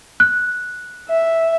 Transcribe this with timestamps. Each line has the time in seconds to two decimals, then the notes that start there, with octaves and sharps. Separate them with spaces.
0.20 F#6
1.10 E5